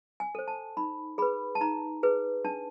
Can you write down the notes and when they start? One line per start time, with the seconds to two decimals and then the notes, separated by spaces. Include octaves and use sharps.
0.20 G#5
0.35 A4 C5
0.48 A5
0.77 D#4 B5
1.18 G#4 B4 B5
1.55 A5
1.61 D#4 A#5
2.03 G#4 B4
2.45 D4 A5